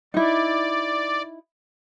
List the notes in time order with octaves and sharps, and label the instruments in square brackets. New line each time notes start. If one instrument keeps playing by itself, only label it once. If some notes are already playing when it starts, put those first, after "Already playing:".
[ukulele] D#4 E4 [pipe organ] D5